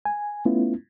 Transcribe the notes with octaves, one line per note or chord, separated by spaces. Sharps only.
G#5
A3 B3 C#4 E4 F4